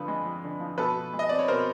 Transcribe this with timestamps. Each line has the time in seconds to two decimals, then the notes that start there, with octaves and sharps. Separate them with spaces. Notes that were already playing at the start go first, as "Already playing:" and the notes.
Already playing: F2 D3 F3 B4
0.08 G#3
0.26 F2
0.44 D3
0.60 F3
0.78 B2 A4 B4
0.96 B2
1.13 G#3
1.19 D#5
1.29 C4 D5
1.39 C#5
1.48 B2 A#4 C5